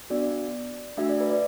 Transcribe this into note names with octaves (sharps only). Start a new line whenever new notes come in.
B3 D4 F#4 D5
A3 D4 F#4 E5
D5
B4
D5